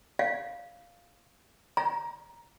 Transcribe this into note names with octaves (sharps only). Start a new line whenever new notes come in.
F5
A#5